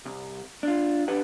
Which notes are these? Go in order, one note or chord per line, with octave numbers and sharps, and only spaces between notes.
C2
D4 F4
E2 D4 G4 B4 F#5